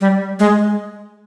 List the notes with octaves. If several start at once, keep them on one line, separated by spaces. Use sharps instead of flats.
G3
G#3